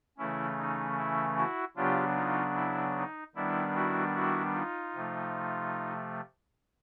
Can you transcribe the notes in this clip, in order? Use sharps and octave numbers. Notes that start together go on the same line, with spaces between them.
C#3 E3 A3 C#4 E4
D#4
E4
E4 F#4
C#3 F#3 B3 D4 F4 G4
D#4 F4
E4
D#4
D#3 G3 B3 D4 E4
E4 F#4
E4 F#4
D#4 F4
C3 F3 A3